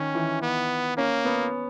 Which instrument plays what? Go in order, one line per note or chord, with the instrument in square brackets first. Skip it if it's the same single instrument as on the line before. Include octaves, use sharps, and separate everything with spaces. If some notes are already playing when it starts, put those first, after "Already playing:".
Already playing: [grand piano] D#3 [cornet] C#4
[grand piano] E3
[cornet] B3
[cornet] A#3 [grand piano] C#4
[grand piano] B3